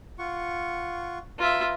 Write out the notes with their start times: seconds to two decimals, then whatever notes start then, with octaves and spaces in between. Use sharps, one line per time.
0.19 F4 F#5 C#6
1.39 F4 B4 E5 A#5